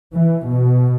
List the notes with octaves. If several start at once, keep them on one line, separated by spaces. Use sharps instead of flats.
E3
B2